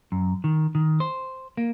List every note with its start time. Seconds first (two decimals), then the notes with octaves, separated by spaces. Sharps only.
0.12 F#2
0.44 D#3
0.75 D#3
1.00 C5
1.57 A#3